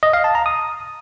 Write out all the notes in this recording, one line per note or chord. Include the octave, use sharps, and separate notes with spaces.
D#5
F5
A5
A#5
D#6